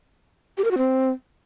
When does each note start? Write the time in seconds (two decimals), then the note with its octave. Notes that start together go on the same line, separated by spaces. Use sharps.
0.58 G4
0.64 A#4
0.71 F#4
0.78 C4